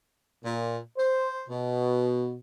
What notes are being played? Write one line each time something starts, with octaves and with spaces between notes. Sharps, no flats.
A#2
C5
B2